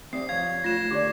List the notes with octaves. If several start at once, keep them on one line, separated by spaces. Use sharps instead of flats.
C4 G4 D5 E5 D#6 C7
F3 C#5 F5 G#6
C#2 A2 C#4 F4 F#6 A#6 E7
D3 A#3 G4 D5 D6